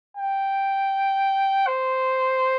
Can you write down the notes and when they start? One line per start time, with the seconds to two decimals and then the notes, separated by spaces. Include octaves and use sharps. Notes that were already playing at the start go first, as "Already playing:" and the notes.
0.17 G5
1.67 C5